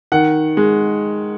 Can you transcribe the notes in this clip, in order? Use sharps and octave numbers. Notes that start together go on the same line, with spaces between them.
D#3 F#5
G#3